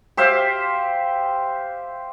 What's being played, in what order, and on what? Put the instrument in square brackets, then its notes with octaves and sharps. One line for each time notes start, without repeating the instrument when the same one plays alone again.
[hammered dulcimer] G4 C5 E5 F5